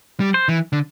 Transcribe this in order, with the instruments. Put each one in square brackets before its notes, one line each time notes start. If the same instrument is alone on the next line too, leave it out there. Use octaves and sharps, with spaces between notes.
[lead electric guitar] G3
[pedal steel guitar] C5
[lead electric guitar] E3
D3